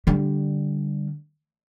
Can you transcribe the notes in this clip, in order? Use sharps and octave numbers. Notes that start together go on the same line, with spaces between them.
D3 G3